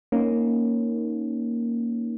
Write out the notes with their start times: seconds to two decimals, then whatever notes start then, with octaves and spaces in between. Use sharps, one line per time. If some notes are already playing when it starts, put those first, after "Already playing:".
0.12 A#3 C#4 D#4